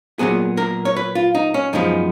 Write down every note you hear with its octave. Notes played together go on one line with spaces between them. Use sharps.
A#2 F#3 B3 G#4
A#4
C#5
B4
F4
D#4
C#4
F#2 F3 G#3 B3 D#4